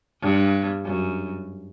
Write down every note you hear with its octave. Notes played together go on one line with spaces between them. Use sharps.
G2
F#2